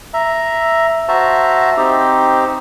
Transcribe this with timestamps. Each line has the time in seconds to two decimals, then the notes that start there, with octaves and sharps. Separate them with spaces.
0.14 E5 A#5
1.08 F#4 C5 E5 A5 A#5
1.77 C4 D#4 G4 C5